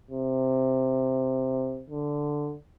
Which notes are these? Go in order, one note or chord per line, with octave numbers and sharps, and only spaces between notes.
C3
D3